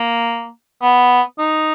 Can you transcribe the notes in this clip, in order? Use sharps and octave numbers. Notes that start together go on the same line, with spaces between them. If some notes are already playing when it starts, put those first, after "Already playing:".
Already playing: A#3
B3
D#4